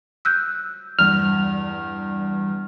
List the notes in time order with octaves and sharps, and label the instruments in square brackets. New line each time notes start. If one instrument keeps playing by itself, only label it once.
[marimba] E6 F#6 G6
[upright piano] E2 G2 [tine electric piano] F6